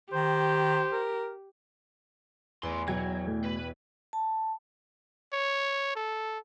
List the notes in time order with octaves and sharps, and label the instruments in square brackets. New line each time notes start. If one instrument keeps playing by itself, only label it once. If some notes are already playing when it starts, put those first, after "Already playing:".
[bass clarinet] D#3 [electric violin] G4 [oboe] C5
[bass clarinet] A#4
[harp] E2 [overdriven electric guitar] A2 C6
[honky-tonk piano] B2 G5 G#6 [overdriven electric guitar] F#3
[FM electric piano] A2
[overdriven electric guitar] B4
[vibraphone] A5
[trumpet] C#5
A4